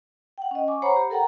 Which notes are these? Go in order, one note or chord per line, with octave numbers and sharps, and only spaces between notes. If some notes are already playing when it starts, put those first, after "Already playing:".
F#5 G5
C#4 D#5
G#5 C#6 D6
C5 C#5 F#5 A#5 B5
G4
A4 A#4 F#5 G5 A#5